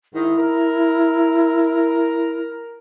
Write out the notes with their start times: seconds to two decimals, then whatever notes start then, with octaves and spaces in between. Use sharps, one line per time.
0.14 G#2 D#3 E4 D#5
0.38 A#4